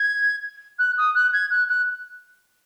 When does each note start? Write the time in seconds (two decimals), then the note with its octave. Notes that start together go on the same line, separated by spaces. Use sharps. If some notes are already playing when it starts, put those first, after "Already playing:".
Already playing: G#6
0.78 F#6
0.97 D#6
1.14 F#6
1.33 G#6
1.50 F#6
1.69 F#6